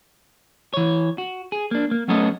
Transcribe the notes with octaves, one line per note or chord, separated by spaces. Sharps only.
E3 C#5
F#4
G#4
A#3 D4
A#3
F#3 A3 B3 C#4 A4 D#5